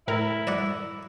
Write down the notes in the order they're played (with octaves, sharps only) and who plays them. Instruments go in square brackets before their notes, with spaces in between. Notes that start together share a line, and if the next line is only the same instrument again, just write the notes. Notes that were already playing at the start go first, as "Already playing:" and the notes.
[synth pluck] A2 A#4 [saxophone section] E4
[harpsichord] D5 D#5 F#5